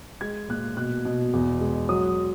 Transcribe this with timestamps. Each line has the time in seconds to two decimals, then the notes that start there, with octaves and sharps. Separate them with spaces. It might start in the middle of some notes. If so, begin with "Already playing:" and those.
0.21 G#3 G#6
0.49 A#2 F#6
0.77 B2 F#6
1.05 B2
1.33 E2
1.61 G#3
1.89 F#3 D#6